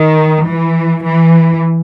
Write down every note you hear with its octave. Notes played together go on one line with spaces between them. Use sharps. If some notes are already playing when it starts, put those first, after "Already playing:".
Already playing: D#3
E3
E3